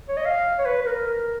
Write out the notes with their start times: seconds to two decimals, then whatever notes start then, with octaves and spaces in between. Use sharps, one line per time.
0.09 C#5
0.17 D#5
0.25 F5
0.58 C#5
0.66 B4
0.81 B4
0.86 A#4
1.06 A#4